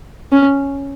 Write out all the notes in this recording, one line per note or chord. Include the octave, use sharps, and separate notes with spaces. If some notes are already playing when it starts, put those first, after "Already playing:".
C#4